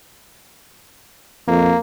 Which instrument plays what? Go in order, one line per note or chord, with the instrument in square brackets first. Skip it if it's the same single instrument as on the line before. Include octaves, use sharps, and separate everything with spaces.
[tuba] F2 [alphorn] A#3